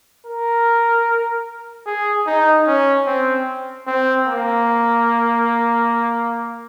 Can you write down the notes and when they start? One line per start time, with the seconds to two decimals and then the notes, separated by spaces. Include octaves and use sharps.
0.26 A#4
1.86 G#4
2.27 D#4
2.67 C#4
3.07 C4
3.87 C4
4.27 A#3